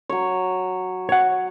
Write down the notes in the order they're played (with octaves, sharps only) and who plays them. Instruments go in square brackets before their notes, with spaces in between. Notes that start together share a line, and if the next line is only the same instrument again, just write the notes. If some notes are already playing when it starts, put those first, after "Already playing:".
[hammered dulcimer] F#3 C#5
[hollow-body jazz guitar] C#5 F#5